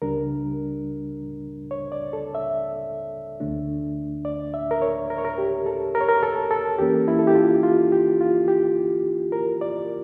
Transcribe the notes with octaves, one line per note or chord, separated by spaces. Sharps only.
C#2 C#3 G3 D4 A#4
C#5
D5
A4
E5
D2 D3 A3 D4
D5
E5
A#4
C#5
A#4
C#5
A#4
G4
A4
A#4
C#5
A#4
A4
A4
E2 E3 A#3 C#4 G4
E4
A4
G4
F4
F4
G4
F4
G4
A#4
D5